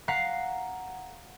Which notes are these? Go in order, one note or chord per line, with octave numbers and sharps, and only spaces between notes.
F5 F#5 A#5 F#6 B6 C7